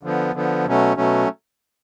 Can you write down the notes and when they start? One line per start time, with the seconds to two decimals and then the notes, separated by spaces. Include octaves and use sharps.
0.03 D3 F3 B3
0.34 D3 F3 B3
0.65 B2 F#3 A3 C#4
0.97 B2 F#3 A3 C#4